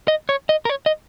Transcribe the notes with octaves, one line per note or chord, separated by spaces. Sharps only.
D#5
C#5
D#5
A#4
C#5
D#5